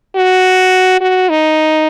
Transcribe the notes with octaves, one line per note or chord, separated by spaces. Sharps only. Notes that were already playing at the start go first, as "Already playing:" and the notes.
F#4
F#4
D#4